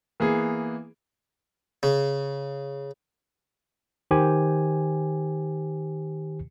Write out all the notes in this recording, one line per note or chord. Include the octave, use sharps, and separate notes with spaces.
E3 A#3 B3 G#4
C#3
D#3 G4 C5 G#5